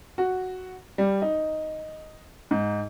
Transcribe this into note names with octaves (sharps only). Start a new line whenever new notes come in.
F#4
G3
D#4
G#2